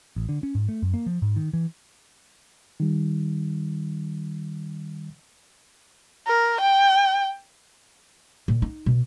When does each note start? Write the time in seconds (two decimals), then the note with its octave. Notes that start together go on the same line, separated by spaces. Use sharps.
0.16 A1
0.29 D3
0.43 C#4
0.55 G#2
0.69 A3
0.82 F#2
0.94 A#3
1.06 F3
1.22 G#2
1.36 D#3
1.53 E3
2.80 D#3 G3
6.27 A#4
6.60 G5
8.48 A#2
8.62 D#4
8.86 B2